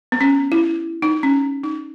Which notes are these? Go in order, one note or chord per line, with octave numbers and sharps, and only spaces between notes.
B3
C#4
E4
D#4
C#4
D#4